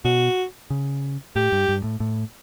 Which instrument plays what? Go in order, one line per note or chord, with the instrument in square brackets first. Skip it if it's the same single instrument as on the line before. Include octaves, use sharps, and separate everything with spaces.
[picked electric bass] B2 [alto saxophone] F#4
[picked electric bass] C#3
[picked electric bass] A2 [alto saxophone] G4
[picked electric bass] G2
G2
A2
A2